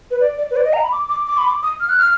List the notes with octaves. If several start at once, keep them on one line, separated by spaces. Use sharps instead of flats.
B4
D5
D5
B4
D5
D#5
A#5
B5
D6
D6
D6
B5
D6
D#6
F6
F#6
F6